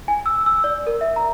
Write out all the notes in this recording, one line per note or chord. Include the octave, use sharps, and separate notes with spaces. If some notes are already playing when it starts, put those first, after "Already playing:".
G#5
E6
E6
D5
A#4
E5
A#5